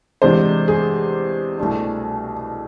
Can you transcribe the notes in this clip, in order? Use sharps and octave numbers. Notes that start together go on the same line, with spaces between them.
E2 C3 G#3 D4 C5
G#4
C2 B2 A3 D4